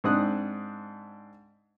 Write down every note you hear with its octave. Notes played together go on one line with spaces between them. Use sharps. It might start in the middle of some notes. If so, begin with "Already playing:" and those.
G#2 C4 D4 D#6 F#6